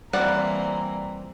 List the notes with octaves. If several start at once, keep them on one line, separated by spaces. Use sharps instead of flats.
E3 G3 A#3 C4 F#4 D5 F#5 A#5